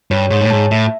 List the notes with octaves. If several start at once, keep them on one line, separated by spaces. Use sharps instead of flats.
G2 C#5
G#2 C#5
A2
G#2 A5
A2 E5